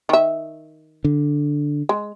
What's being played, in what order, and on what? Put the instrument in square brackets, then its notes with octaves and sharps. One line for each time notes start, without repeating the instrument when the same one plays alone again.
[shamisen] D#3 E5
[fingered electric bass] D3
[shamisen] G#3